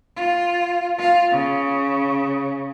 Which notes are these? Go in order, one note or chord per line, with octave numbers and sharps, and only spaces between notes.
F4
F4 F5
C#3